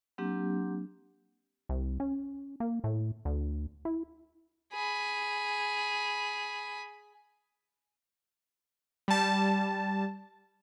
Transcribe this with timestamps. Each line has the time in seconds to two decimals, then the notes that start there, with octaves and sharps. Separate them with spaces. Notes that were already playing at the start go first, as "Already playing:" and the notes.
0.18 F#3 A#3 C4 D4 G4
1.69 C2
2.00 C#4
2.60 A#3
2.84 A2
3.25 D2
3.85 E4
4.73 G#4 B5
9.08 G3 A5